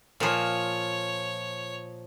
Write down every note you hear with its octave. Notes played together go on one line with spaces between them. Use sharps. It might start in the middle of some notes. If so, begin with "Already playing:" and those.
A#2 F3 C#5